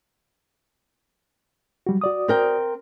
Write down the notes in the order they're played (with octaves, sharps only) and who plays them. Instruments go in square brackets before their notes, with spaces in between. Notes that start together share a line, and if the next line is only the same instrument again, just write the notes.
[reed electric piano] F#3 G3 F#4
F#4 D5 D#6
[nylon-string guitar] C4 A#4 G5